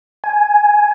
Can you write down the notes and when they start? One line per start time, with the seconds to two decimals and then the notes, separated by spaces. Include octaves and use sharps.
0.24 G#5